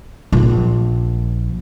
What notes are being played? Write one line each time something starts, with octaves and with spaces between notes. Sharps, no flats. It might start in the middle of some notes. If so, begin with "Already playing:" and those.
A#1